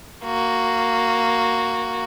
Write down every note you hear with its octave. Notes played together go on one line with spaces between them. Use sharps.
A#3 F#4